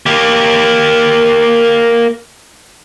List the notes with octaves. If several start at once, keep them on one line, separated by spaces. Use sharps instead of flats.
A#3 G4